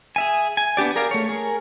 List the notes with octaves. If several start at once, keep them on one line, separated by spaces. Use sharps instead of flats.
G#4 E5 G#5
G#5
B3 D4 G4 D5
G#4 A#4 D5 F5
A3 C#5
G#4 A#4